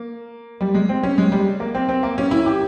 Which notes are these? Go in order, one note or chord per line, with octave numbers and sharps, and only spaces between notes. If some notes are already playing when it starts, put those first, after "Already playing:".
Already playing: A#3
G3
G#3
C4
C#4
G#3
G3
A#3
C4
C4
A#3
C#4
E4
G4